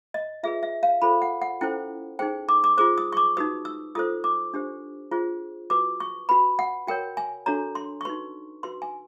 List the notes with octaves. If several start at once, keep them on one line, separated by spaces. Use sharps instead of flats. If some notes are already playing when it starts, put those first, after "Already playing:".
D#5
F4 G#4 B4 E5
E5
F5
F4 A4 C5 B5
F#5
F#5
C#4 E4 A4 C5 G5
D#4 G#4 C5 G5
D6
D6
F4 G#4 C5 D6
D#6
C#6
D6
D#4 F#4 B4 D#6
E6
F4 A4 C5 D#6
D6
D4 G4 C5
F4 G#4 C5
F#4 B4 D6
C#6
F#4 B4 B5
F#5
F#4 A#4 C#5 G5
G#5
D4 F#4 A4 C#5 A#5
C6
C#6
D#4 F#4 B4 C6
F#4 B4 C6
G#5